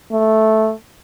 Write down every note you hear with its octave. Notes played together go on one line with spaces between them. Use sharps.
A3